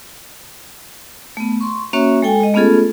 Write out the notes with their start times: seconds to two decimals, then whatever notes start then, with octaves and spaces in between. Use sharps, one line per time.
1.37 A3 B3
1.61 C6 C#6
1.93 A#3 C#4 F#4 C#5 E5 C#6
2.22 G#3 A4 G5 G#5
2.40 G#3 D#5
2.54 A3 B3 C#4 F4 G#4 A4